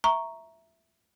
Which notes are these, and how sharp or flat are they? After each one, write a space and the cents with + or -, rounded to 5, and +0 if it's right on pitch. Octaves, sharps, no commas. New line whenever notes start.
E5 +0 A#5 +0 C#6 +0